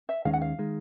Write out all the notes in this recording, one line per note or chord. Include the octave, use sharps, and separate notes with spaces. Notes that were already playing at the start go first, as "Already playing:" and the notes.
E5
D#2 D#3 G#3 C#4 F5
F#5
F5
D#3 G#3